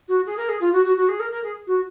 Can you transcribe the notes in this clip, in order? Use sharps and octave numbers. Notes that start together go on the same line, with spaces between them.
F#4
G#4
A#4
G#4
F4
F#4
F#4
F#4
G#4
A#4
A#4
G#4
F#4